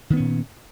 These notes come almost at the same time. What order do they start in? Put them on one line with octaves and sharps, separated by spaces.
D#3 B3 C#4 A#2